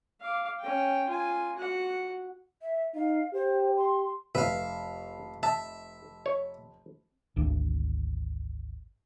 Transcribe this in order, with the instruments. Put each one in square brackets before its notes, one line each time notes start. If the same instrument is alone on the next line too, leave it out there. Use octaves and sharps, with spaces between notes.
[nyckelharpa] F5 D6
C#4 G5
F4 G#5
F#4 F#5
[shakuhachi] E5
[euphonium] D#4 [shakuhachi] F5
[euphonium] G4 [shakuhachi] C5
[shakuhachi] C6
[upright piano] F1 [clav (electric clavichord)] B4 [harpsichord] E5 F5
[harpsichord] E5 [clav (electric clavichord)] A5
[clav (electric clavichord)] C#5
[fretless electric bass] G#1 D2